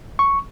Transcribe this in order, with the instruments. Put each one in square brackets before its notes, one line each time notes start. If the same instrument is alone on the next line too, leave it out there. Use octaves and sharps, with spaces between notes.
[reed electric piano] C#6